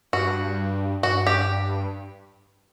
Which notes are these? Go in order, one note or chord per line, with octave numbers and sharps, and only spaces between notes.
G2 F#4
G2 F#4
G4